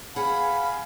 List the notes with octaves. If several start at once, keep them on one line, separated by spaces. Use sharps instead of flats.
G#4 B4 F5 F#5 G#5 B5